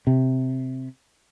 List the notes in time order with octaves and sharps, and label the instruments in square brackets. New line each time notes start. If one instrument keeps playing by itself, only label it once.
[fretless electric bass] C3